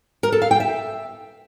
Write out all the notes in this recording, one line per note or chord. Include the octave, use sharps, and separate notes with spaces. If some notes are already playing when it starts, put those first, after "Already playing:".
A#4
A4
F5
G5
E5